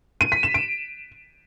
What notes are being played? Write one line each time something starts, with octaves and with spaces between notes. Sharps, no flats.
D#7
B6
E7
D7